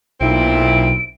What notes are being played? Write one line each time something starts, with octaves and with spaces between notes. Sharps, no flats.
B1 A#2 C4 E4 D7